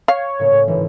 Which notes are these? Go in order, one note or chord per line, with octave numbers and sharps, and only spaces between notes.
C#5 F5
A2 C#3 A#3
A2
G#1 E3